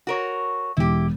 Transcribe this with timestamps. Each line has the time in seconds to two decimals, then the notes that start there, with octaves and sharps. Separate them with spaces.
0.07 F#4 A#4 C#5
0.77 E1 E4 G4